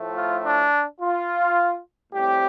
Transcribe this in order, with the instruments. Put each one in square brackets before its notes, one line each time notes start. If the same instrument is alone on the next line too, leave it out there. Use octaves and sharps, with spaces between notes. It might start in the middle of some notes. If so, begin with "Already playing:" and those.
Already playing: [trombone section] A2 F3 A3
F4
D4
F4
A2 G3 C4 G4